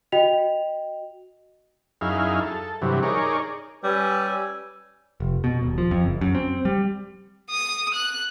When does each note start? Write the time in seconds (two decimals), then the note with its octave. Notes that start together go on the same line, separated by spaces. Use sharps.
0.12 F#4 D#5 G5 F7
2.01 F#2 D#4 E4 G#4 F5
2.41 A4
2.82 G2 C3 E3 F#3
3.03 D#4 G#4 A#4 C#5 D5
3.84 G3 C#4 B4 G#5 E6
5.20 F1
5.44 B2
5.62 D#1
5.78 F3
5.91 F2
6.04 F#1
6.21 F#2
6.35 C4
6.65 G3
7.51 D#6
7.94 F#6